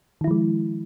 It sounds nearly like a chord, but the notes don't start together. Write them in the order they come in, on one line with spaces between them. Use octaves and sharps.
D#3 E4 F3 G#3